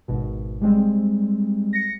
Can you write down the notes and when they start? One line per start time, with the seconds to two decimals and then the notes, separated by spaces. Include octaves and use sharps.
0.08 G#1 B2
0.61 G3 G#3 C4
1.73 A#6 C#7